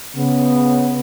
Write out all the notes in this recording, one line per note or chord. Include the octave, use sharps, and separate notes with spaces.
C#3 B3